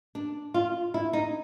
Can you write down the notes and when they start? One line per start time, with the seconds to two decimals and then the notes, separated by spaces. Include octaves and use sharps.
0.15 D4
0.54 F4
0.94 E4
1.13 D#4